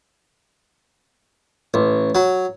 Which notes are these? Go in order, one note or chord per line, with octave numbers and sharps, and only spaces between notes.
A1
F#3